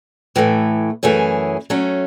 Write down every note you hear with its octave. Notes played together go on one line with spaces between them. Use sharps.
A2 E3 A3
F#2 E3 A3 C#4 G#4
F#3 A3 C#4